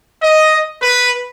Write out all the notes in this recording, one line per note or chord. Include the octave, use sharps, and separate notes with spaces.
D#5
B4